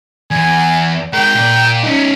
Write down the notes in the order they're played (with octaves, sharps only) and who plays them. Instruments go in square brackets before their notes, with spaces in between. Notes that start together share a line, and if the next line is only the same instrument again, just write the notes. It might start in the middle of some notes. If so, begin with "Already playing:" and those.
[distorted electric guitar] E2 [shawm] G#5
[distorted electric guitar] G#3 A#4 [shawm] G5
[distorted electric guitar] A#2
C#4 D#4